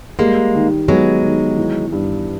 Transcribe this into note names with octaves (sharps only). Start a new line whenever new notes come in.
G3 G#3 A#3
D#3
F#3 G#3 B3
D#3
E3
G2